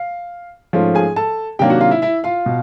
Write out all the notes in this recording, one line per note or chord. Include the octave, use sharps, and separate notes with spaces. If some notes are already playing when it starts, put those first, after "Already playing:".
Already playing: F5
G#2 F3 A3 C#4 F4
G#4 G#5
A4 A5
C3 D#3 F#3 A#3 D4 G4 G5
F#4 F#5
F4 F5
E4 E5
E4 E5
F4 F5
B2